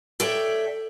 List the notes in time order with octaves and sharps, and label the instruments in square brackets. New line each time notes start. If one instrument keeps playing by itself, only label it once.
[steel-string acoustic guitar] A4 C#5 D5 E5 G5